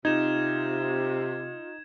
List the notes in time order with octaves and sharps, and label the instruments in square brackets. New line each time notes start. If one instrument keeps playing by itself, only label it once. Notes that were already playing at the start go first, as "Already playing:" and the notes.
[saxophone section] C3 [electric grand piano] D#4 [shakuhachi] F4 [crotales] G#6 E7